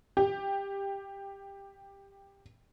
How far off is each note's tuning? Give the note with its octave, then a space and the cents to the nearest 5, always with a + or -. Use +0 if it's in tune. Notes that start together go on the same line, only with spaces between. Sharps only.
G4 +10